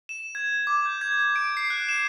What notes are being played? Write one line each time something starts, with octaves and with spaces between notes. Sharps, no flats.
E7
G#6
D6
G6
G#6
D7
C7
F#6
E7